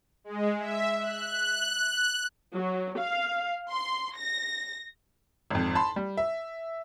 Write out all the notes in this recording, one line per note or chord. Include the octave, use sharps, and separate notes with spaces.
G#3
E5
F#6
F#3
F5
C6
A#6
G#1 F2
A5 B5 C6
G3
E5